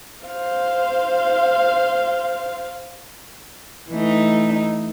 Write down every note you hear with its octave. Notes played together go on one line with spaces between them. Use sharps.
C5 F5
E3 A3 D#4